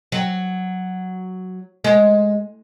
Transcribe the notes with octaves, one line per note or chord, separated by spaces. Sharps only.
F#3
G#3